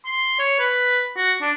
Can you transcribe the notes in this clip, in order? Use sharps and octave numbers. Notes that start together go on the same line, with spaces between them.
C6
C#5
B4
F#4
D4